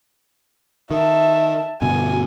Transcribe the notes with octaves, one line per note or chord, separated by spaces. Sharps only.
D#3 E5 A5
G2 B2 D3 G#5